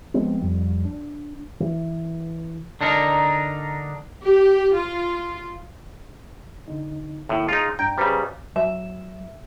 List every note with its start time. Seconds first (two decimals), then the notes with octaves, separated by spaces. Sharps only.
0.14 F3 G#3 B3 C4
0.41 F2 G3
0.85 D4
1.60 E3
2.81 D3 D4 D#4 A#4
4.23 G4
4.74 F4
6.68 D3 D#4
7.29 A2 D#3 A#3 E4
7.48 D#4 F4 G#4
7.79 G2 D4 G5 A#5
7.98 C#3 G3 B4 C5 A#5
8.56 F#3 E5